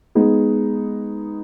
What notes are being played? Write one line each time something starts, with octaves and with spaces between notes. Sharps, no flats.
G#3 B3 D#4 G#4